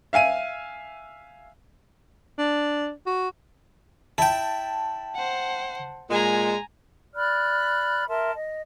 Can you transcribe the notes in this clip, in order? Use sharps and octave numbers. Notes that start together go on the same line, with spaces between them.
E5 F5 G#5 D#7
D4
F#4
E4 G5 A5
C5 F#5
A#2 G#3 G#5 A#5
D5 B5 F6 F#6
A#4 E5 A5 C6
D#5